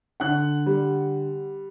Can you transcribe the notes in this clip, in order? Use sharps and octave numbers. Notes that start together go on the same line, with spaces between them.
D3 F#5 F#6
G3